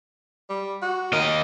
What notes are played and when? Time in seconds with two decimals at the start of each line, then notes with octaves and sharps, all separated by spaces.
0.49 G3
0.82 F#4
1.12 D#2 A#4 D#5